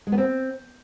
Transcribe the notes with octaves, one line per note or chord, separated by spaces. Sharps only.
G#3
B3
C4